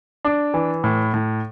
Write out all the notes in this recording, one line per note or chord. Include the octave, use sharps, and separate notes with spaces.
D4
E3
A2
A2